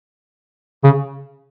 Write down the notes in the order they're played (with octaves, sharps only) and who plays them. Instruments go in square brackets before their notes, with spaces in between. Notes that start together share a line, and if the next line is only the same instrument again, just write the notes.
[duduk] C#3